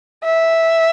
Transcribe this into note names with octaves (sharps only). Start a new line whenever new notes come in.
E5